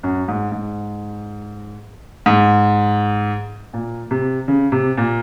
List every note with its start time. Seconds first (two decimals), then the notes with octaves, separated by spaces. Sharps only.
0.03 F#2
0.28 G#2
0.52 G#2
2.26 G#2
3.73 A#2
4.11 C3
4.48 C#3
4.72 C3
4.97 A#2